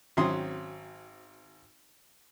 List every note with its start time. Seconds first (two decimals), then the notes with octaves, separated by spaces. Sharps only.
0.17 G#1 F#3 C4 C#4 C6 D#6